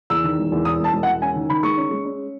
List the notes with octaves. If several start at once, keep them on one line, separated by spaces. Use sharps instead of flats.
E2 E6
D#3
E1
E2
E1 D#6
E1
A5
E1
F#5
E1
C#4 G#5
D#3
D#3 B5
G#3 C#6
C#4
G#3
C#4